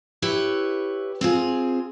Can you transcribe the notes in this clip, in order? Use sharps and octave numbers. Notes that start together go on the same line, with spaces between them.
E4 G4 B4 C#5
C4 F4 G#4